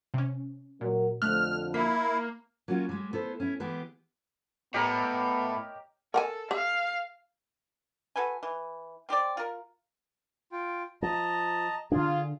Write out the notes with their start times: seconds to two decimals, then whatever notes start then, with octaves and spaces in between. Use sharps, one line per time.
0.14 C3 C#4
0.81 A#2 F#3 A#4
1.22 F2 D3 F3 A3 F6 F#6
1.74 A#3 E4 B6
2.68 F#3 A#3 C#4 F4 F#4
2.89 G3 G#3
3.13 B3 E4 A4 C5
3.40 C#4 E4
3.60 E3 G#3 B3 G4
4.74 A2 B3 G4 A#4 C#5 D#5
6.14 A4 A#4 F#5 G#5
6.51 G4 F5
8.16 F#4 A4 B4 G#5
8.43 E3
9.09 C4 G4 C5 D5
9.37 F4 A#4
10.52 F4 G5
11.02 F3 D#5 A5 A#5
11.92 D3 D4 F4 G#4